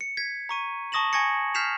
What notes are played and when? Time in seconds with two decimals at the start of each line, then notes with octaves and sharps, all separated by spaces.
0.01 C#7
0.17 G#6 B6
0.49 A#5 C#6 D#7
0.92 A5 C#6 D#6 A#6 E7 F#7
1.13 G#5 C#6 G#6 A#6 C#7
1.54 F6 G6 B6 C7 E7 F7